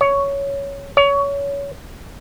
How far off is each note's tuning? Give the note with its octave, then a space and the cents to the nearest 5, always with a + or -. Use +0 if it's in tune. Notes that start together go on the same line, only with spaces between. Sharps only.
C#5 +10
C#5 +25